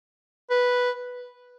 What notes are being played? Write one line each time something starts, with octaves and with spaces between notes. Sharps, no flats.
B4